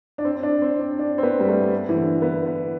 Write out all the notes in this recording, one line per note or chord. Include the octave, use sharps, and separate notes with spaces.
D4
C4
C4
D4
C4
D4
D4
C4
B3
G3
A3
E3
D3
B3
B3